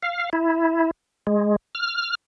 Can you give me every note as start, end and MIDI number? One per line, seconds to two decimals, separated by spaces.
0.03 0.30 77
0.33 0.91 64
1.27 1.56 56
1.75 2.15 89